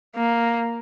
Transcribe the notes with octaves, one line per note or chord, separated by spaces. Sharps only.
A#3